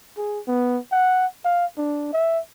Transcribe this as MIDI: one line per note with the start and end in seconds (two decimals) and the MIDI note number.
0.17 0.40 68
0.48 0.78 59
0.92 1.26 78
1.45 1.66 77
1.77 2.13 62
2.13 2.39 76